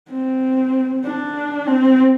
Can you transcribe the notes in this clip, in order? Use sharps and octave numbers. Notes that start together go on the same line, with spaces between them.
C4
D4
C4